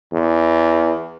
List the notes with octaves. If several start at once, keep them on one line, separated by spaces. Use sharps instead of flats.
E2